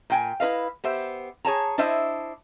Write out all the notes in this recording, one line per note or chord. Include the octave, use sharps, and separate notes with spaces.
A#2 G5 G#5
E4 B4 D#5 F5
B3 G4 C5 E5
G#4 C#5 A5 A#5
D4 E4 C5 D#5 E5